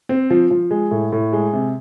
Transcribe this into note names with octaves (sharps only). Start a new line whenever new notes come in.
C4
F3
F3
G#3
A2
A2
G#3
C3